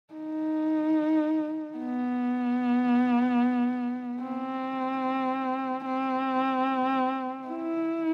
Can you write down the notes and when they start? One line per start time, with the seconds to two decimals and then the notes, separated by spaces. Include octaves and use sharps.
0.14 D#4
1.78 B3
4.22 C4
5.86 C4
7.48 E4